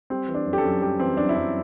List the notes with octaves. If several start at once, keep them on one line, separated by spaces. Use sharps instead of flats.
G3 C4
E3
D4
F#2
G4
A4
F#2
G3 G4
E3 C4
F#2 D4
E4
F#2 D4